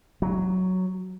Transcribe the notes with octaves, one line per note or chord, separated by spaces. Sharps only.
F#3